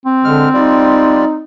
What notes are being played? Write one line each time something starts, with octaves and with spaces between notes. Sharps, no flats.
C4
D3 G#3 F6
G3 D#4 F4 D5